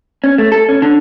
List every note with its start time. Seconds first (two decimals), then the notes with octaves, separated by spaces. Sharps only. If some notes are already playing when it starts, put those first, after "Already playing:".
0.24 C#4
0.38 A3
0.52 A4
0.69 C#4
0.82 D3